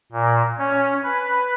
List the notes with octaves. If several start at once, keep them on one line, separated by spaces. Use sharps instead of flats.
A#2
C#4
B4